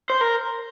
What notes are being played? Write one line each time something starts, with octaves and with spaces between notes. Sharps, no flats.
C5
A#4